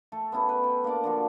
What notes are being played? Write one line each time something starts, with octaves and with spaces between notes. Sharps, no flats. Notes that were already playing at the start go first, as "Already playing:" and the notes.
A3 A4
B3 C#4 E4 G4
B4
G5
A#3 D4 D5 D6
D3 F3 F#4